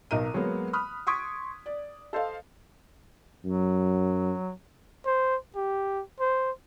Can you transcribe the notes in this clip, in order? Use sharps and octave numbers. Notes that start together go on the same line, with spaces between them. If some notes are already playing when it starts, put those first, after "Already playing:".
B1 D#4 A#4 A#5 D#7
F#3 G#3 A#3 B3
B5 D#6 F6 F#6
C6 C#6 D#6 G#6 B6 D7
D5
A4 C5 D#5 F5
F#2 F#3
C5
G4
C5